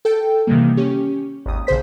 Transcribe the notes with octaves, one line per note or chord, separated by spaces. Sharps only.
A4 G5
C3 D#3 E3 G3 A#3
C#4 G4
G#1 D#2 D#6
A#1 C#3 G#4 C5 B6